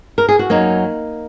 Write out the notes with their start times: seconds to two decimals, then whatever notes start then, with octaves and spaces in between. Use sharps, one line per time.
0.18 A#4
0.29 G#4
0.39 F#4
0.50 F#2 F#3 A#3 D#4